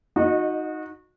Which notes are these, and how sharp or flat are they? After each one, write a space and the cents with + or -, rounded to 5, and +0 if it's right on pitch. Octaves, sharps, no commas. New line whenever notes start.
D#4 +0 F#4 -25 D#5 -25